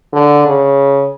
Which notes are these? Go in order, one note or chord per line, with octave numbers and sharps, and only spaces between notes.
D3
C#3